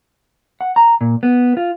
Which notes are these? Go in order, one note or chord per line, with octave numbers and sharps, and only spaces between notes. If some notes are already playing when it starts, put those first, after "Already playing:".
F#5
A#5
A#2
B3
F4